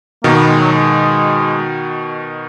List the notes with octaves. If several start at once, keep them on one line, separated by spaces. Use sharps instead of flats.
B2 D#3 A#3
B3
G#3
F#3
G#3